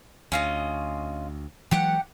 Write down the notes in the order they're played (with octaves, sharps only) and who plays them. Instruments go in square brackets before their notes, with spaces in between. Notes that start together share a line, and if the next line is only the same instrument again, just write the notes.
[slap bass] D2 [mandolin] C#4 F4 D#5
[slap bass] E3 F#3 G#3 [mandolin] G4 F#5